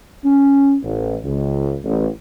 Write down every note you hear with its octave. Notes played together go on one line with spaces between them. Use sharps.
C#4
A1
C#2
A1